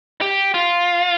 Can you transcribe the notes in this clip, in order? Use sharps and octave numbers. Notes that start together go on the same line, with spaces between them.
G4
F4